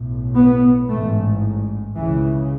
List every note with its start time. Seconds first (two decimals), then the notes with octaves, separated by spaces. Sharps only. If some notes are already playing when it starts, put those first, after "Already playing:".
Already playing: B1 A2
0.36 B3
0.88 A1 G#2 A3
1.95 C#2 C#3 E3